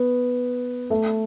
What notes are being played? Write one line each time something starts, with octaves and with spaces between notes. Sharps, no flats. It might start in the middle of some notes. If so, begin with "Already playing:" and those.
Already playing: B3
A3